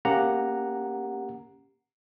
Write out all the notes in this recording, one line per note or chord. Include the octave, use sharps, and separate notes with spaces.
A#3 C#4 G4 F#5 A#5